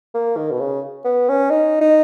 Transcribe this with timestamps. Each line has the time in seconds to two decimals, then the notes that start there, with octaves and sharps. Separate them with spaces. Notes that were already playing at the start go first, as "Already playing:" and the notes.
0.14 A#3
0.37 D#3
0.51 B2
0.60 C#3
1.05 B3
1.29 C#4
1.50 D#4
1.81 D#4